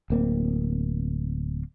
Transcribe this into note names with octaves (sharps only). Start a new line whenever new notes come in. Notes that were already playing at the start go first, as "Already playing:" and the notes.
D1 A#3 C4